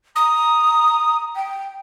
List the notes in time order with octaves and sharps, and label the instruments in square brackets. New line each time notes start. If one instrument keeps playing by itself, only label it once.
[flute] A#5 [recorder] D#6
[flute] G5